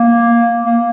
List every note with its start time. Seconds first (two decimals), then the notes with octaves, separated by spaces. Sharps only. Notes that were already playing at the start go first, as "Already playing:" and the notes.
Already playing: A#3
0.65 A#3